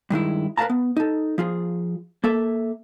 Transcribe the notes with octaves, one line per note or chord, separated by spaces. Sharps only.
G2 D#3 G#3 E4
A#4 B4 E5 F5 A5 A#5
B3
D#4 A4
F3 F4 G#4
A#3 A4 E5